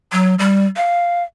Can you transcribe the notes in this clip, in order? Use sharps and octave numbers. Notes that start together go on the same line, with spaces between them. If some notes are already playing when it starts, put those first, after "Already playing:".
F#3
G3
F5